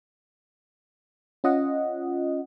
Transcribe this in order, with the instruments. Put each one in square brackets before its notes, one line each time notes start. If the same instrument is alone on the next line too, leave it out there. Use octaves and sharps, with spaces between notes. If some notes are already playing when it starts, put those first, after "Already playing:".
[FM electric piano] C#4 F4 D#5 F#5